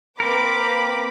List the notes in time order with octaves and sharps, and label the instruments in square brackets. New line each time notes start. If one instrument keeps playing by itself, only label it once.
[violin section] A#3 B4 D6 [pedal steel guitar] C4 A#4 [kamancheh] B5